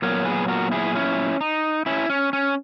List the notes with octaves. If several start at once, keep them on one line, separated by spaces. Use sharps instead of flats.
A#2 F#3 B3 A#4 C#5
G#4 B4
F#4 A#4
E4 G#4
C#4 E4
D#4
C#4 E4
C#4
C#4